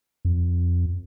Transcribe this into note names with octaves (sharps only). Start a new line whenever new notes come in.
F2